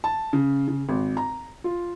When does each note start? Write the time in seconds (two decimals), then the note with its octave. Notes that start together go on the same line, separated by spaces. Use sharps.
0.04 A5
0.33 C#3
0.68 C#3
0.89 G#1
1.17 A#5
1.64 F4